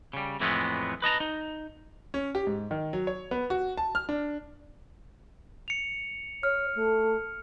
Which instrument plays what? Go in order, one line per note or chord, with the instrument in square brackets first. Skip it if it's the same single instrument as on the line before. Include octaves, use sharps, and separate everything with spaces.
[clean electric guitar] C#3 G3
F2 A2 E3 G#3 A3 B3
B4 D#5 A5 A#5
D#4
[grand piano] C#4
G4
G#2
D#3
F#3
C#5
B3
F#4
A5
F6
D4
[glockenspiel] C#7 F7
[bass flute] C#5 [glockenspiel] F6
[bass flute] A3